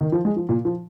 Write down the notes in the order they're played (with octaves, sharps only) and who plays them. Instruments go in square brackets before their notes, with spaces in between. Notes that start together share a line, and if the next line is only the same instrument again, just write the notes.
[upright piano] D#3
F3
G#3
F3
A#2
F3